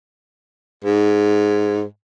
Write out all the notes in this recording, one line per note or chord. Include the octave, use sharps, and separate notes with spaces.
G#2